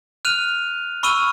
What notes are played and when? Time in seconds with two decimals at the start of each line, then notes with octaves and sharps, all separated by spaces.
0.25 F6 F#6 D#7 F7
1.03 B5 C#6 E6 F6 D#7 G7